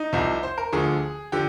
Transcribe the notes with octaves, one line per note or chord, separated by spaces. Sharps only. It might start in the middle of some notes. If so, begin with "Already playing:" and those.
Already playing: D#4
C2 C3 F3
C5
A#4
D2 D3 F3 G#4
D3 F3 G4